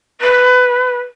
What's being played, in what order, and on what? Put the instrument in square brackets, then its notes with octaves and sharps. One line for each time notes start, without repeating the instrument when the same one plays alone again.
[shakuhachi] B4